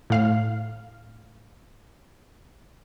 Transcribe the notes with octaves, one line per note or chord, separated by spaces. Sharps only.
A2 F5 F6